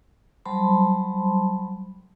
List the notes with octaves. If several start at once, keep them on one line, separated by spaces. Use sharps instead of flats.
F#3 G3 C5 A5 B5 C6